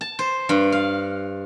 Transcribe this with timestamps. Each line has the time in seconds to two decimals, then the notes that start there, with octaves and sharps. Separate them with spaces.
0.01 A5
0.19 C5
0.49 G2
0.72 F5